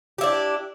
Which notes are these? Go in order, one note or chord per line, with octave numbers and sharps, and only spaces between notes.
D4 E4 G4